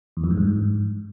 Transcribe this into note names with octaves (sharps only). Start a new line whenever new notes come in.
E2
F2
G#2
G2
G#2